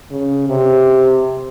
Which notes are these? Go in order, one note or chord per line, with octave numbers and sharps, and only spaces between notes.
C#3
C3